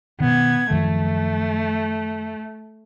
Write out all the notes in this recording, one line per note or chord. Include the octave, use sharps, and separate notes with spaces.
B2 D#3 B3 G#6
F#2 D#3 F3 A3